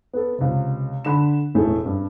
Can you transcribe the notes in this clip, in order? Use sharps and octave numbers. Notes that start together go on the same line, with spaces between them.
B3 A4
C#2 C3
D3 B5 E7
E1 A2 A3 G#4
G2